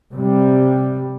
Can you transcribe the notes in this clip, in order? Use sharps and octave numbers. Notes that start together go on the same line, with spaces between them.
C3 G3